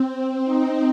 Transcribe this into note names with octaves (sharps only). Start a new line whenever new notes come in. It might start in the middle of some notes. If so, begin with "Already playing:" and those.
Already playing: C4
D#4